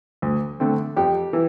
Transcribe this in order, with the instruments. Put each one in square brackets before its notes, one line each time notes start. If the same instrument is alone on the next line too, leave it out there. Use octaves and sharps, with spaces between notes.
[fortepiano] D2
D3 A3 C4
F2 G4
E3